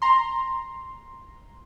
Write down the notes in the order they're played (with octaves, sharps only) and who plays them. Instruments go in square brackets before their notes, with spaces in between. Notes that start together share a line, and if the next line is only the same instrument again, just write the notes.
[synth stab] A#5 C6